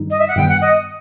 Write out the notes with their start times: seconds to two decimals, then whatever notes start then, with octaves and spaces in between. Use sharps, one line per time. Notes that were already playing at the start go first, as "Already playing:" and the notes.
Already playing: G2 D#3 G3 D#4
0.11 D#5
0.19 E5
0.28 F#5
0.36 G2 D#3 G3 B3 G5
0.49 F#5
0.61 D#5